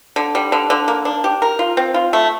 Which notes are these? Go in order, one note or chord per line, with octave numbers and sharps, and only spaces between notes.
D3
G3
D3
D3
A#3
D4
G4
A#4
F4
C4
F4
A3